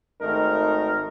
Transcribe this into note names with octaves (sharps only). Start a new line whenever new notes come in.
G#1 A3 D#4 A#4